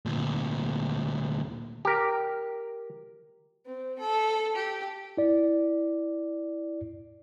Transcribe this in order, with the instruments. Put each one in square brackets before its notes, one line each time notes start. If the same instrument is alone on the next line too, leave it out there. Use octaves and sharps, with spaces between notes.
[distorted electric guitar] D2 A#2
[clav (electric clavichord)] G4 A#4
[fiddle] C4
A4
G4
[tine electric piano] E4 D5